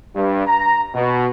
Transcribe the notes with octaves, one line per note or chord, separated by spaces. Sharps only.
G2
A#5
B2